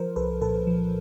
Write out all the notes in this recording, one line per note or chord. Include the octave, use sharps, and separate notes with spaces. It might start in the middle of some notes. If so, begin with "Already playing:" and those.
Already playing: F3 A#4 C5
C2 A4 B4
A#2 A4 B4
F3